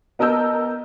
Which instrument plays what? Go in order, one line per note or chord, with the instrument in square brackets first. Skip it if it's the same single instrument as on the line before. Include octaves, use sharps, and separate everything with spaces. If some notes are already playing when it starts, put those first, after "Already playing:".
[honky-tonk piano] B3 A#4 D#5 A5 E6 G6